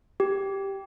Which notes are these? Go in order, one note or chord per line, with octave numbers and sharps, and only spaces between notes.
G4